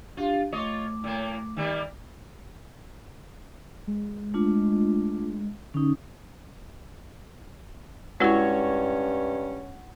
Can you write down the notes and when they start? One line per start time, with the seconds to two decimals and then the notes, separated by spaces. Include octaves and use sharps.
0.17 D4 F4 G4 F5
0.52 A3 F4 C#5 D#5 D6
1.04 A2 A#3
1.57 D#3 G3 A#3
3.87 G#3
4.34 A3 D4 F4
5.74 D3 C#4 D#4
8.20 G2 G#3 C#4 E4 F#4 C#5